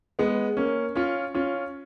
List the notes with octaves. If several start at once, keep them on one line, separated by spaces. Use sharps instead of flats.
G#3 B3
A#3 C#4
C#4 F4
C#4 F4